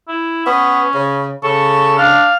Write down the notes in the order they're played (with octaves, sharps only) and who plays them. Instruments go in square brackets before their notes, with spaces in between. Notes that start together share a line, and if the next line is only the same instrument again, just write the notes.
[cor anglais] E4
[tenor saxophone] B3 [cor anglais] C#4
[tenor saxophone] C#3
[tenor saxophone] C#3 [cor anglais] A4 [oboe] C#6
[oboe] D4 [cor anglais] F5